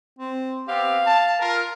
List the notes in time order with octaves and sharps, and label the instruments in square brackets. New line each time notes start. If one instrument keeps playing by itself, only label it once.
[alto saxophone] C4
[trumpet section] B3 C4 G4 [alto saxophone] F5
[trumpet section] A5
F4 A#4